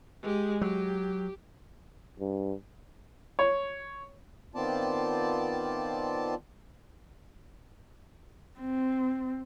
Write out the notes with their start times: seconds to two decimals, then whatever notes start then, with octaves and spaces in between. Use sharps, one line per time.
0.22 G#3 G4
0.61 F#3 G4
2.20 G2
3.39 C#5
4.55 D#3 B3 C4 F4 D5 A5
8.60 C4